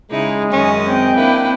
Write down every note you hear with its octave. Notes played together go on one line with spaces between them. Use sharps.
C#3 G#3 D#4 E4
F#2 D#3 C#4 D#5
C4 G5
A#3 D4 E4 B4